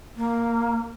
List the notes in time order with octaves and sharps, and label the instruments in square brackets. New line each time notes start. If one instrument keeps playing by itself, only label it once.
[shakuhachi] A#3